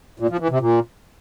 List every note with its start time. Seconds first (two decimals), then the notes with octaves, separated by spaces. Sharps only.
0.20 A#2
0.30 F3
0.40 E3
0.50 C3
0.61 A#2